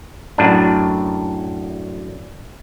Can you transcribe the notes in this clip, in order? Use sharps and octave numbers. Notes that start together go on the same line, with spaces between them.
F#2 A2 D4